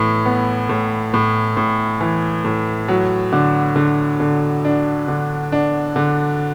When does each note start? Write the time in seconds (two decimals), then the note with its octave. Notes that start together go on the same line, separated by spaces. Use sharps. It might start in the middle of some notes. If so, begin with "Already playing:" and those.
Already playing: A2 E3
0.26 B3
0.69 A2
1.14 A2
1.57 A2
2.01 E3
2.45 A2
2.88 F#3
3.32 D3
3.76 D3
4.20 D3
4.65 D4
5.08 D3
5.52 D4
5.96 D3